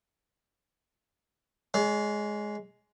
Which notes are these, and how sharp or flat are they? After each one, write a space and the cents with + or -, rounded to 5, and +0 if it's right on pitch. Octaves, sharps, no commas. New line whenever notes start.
G#3 +10 C#5 +40